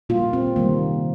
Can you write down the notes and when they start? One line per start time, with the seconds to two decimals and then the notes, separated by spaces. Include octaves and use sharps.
0.09 A#2 G3 A#3 F4
0.33 C4
0.56 C3 D#3 G3 A#3